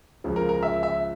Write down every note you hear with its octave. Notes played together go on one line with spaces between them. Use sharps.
C#2 C#3 F3
A#4
A#4
E5
E5